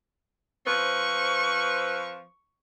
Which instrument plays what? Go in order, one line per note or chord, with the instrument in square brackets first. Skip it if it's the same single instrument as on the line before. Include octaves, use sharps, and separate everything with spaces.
[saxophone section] F3 C4 B4 [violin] C#6